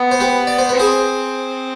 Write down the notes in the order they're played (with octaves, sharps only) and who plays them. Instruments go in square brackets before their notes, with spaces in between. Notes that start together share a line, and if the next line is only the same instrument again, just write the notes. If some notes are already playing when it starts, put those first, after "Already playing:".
Already playing: [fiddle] B3
[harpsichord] C5
G4 B4
D5
C5
[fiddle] C4 [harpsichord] B4
[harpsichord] G#4 C5